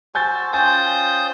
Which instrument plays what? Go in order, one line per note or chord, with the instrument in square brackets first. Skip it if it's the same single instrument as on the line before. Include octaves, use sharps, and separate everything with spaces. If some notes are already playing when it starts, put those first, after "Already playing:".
[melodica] F#4 C5 E6 [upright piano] G#5 G6 A6
[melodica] C#4 F4 G5 [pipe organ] C5 D#6 G6 [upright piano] G#5 A6